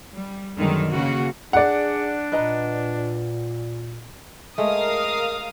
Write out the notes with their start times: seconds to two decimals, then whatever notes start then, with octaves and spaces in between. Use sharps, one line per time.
0.14 G3
0.57 F#2 B2 D3 D#3 G3 G#3
0.89 C#3 A#3 F#4
1.53 D4 G#4 D5 F#5
2.32 A#2 B4 D#5 A#5
4.58 G#3 A3 A#4 F5 D#6